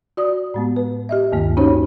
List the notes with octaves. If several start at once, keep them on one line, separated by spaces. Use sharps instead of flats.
F#4 D5 D#6
A2 G#3 B3
B4
G4 D#5 E5
D2 G2 D#3 A#3
C#4 D#4 F#4 G4 C5 C#5